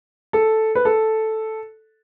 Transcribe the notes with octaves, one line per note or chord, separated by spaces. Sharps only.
A4
B4
A4